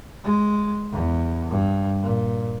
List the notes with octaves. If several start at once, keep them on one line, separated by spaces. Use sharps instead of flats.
G#3
E2
G2
A#2